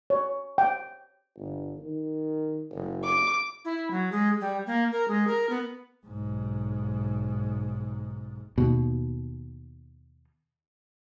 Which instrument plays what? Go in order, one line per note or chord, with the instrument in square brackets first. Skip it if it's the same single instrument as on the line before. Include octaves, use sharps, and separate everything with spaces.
[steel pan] C#5
G5
[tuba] G1
D#3
F#1
[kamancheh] D6
[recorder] E4
F#3
G#3
G3
A#3
A#4
G#3
A#4
B3
[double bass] B1 G#2
[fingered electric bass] D#2 B2